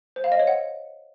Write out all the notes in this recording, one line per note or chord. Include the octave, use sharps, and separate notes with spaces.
C5
F5
D#5
C#5
F#5